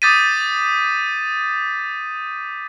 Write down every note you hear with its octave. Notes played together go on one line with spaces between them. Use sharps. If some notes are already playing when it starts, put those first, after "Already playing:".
D6 D#6 G6 A6 B6 D#7